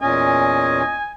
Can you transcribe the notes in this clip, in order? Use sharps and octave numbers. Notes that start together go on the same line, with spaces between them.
E2 A#2 C#4 D#5 G#5